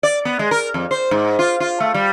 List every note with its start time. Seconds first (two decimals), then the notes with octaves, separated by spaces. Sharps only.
0.03 D5
0.25 B3
0.39 G#3
0.51 A#4
0.74 F2
0.91 C5
1.11 G#2
1.39 F4
1.60 F4
1.80 A3
1.94 G3